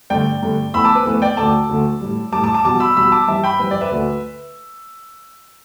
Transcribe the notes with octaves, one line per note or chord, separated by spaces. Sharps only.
G2 D3 A3 D5 G5
G2 D3 A3
E2 E3 A3 B5 E6
A5 D6
B4
E2 E3 A3 B4
D5 G5
D2 D3 A3 A5 D6
D2 D3 A3
A2 G3
A2 G3 A5 D6
A5 D6
A5 D6
E2 B2 G3 A5 D6
B5 E6
E2 B2 G3 B5 E6
A5 D6
G2 E3 G3 E5 A5
G5 B5
G2 E3 G3 B4
D5
B4 E5
D2 D3 A3